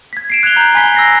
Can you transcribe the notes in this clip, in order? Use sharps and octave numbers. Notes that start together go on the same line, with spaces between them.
G#6 B6
C7 D7 E7
F#6 G#6 C#7 F7 G7
A#5 F#6 G6 F7 F#7
G#5 B5 B6 G7
E6 A#6 C7